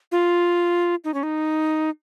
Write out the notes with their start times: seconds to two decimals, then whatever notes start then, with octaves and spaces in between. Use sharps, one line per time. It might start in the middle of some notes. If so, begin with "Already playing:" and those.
0.12 F4
1.04 D#4
1.14 C#4
1.23 D#4